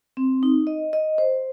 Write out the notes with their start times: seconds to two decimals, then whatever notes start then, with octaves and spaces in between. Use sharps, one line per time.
0.17 C4
0.43 D#4
0.67 D#5
0.93 D#5
1.18 C5